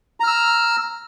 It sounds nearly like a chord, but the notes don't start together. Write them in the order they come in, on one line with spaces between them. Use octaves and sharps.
A#5 F6 E6